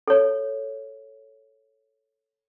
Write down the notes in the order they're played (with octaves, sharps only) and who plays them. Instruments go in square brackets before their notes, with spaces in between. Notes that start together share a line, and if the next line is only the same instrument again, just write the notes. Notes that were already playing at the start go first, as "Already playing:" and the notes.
[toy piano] A4 C#5